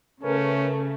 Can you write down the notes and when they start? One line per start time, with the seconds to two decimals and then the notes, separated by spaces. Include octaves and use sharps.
0.24 C#3 A3 C#4 A#4 B4